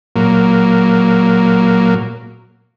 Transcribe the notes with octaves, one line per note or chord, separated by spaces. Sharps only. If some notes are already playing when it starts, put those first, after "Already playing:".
A#2 F#3 A#3